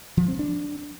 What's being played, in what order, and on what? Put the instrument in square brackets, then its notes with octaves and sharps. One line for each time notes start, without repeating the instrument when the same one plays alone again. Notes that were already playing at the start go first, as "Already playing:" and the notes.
[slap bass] F3
C4
D4